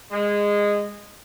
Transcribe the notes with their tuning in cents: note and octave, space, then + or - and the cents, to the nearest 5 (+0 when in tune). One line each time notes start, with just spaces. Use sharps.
G#3 -15